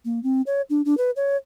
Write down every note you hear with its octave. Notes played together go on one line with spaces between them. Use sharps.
A#3
C4
C#5
D4
D4
B4
C#5